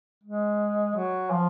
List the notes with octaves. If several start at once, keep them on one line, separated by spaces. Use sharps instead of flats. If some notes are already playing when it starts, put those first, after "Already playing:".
G#3
F#3
F3